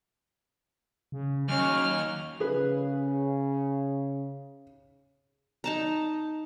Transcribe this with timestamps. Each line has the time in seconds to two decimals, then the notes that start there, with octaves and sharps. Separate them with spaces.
1.12 C#3
1.48 D#2 F#3 C#4 G#5 C#6 F6
2.40 C#3 G#4 B4
5.64 D#4 A5 A#5